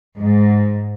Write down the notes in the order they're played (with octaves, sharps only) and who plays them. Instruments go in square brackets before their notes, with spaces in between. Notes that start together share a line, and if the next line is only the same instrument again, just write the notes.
[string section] G#2